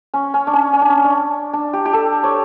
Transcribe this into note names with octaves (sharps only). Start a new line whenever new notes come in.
C#4
C#4
D4
C#4
C#4
D4
C#4
D4
D4
G4
G4
A4
C#5